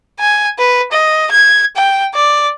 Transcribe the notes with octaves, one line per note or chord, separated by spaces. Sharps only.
G#5
B4
D#5
G#6
G5
D5